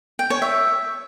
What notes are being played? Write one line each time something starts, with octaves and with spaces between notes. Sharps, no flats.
G5
C#5
E5